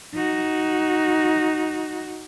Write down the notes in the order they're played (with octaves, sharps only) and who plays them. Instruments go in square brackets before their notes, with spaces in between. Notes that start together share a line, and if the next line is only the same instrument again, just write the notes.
[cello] D#4 F#4